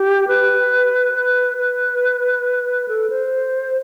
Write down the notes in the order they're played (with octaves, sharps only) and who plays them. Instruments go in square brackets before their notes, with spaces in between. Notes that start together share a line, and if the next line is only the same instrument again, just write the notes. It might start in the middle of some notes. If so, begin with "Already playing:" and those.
Already playing: [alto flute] G4
B4
B4
B4
A4
C5